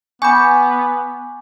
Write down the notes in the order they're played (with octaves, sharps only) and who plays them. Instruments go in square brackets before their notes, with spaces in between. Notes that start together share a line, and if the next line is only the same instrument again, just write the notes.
[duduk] B3 [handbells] G#5 B5 [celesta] C#6 D6 G6